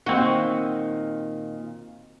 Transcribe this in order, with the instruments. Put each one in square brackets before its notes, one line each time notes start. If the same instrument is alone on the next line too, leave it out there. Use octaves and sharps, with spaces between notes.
[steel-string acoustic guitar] A#2 D#3 [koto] C4 F#4